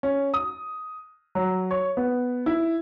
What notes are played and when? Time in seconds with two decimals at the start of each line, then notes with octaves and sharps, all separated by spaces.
0.03 C#4
0.34 D#6
1.35 F#3
1.71 C#5
1.97 B3
2.46 E4